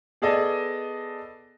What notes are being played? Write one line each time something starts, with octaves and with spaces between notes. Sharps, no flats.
B3 G#4 A4 D5 D#5